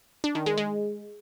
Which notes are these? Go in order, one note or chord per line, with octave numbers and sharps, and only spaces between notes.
D4
D#3
G#3
G#3